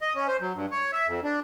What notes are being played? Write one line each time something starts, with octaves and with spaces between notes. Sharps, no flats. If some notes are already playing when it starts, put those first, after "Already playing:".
D#5
C#4
C5
F#3
G2
C#5
E5
F2
D4